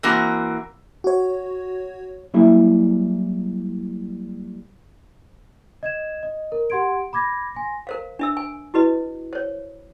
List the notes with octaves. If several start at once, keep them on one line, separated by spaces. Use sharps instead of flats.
E3 A#3 C4 F#4
F#4 C#5
F#3 G3 A#3 E4 G#4 E5
D#5 G#6 E7
D#5
A#4
G4 F#5 C6 G#6 D7
B5 D6 G#6 A#6
G#5 C6 A#6
A#4 C5 F5
D4 E5 E6
G#5
E4 F#4 B4 D#5
C5 C#5